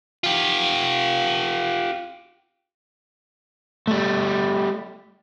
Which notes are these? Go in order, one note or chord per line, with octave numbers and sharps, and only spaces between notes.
F4 G4
G3 A3